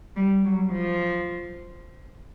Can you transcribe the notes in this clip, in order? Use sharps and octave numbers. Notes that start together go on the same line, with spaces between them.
G3
F#3
F3